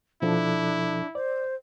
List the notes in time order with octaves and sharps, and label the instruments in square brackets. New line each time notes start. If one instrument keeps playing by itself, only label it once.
[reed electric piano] B2 F3 A4 [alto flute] D4 [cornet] E4
[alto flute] C5 [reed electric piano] D5